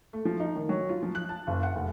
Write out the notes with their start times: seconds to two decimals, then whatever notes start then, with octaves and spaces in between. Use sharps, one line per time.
0.13 A3
0.25 F3
0.40 D#4
0.56 D#3
0.69 F#3
0.89 F4
1.03 F3
1.15 F#6
1.29 A5
1.47 F#1
1.63 F#5
1.76 F1